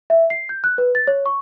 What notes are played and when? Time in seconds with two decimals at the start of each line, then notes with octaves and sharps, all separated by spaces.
0.10 E5
0.30 C7
0.49 G6
0.64 F#6
0.78 B4
0.95 A6
1.07 C#5
1.26 C#6